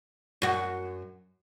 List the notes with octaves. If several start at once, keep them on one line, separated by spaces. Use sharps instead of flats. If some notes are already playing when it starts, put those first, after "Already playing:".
F#2 F#4